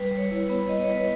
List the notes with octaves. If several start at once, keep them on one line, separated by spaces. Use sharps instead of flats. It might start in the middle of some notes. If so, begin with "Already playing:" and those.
Already playing: G3 B4
G3
C#5
E4
B4
B3
G3 D#5
C#5
G3 B4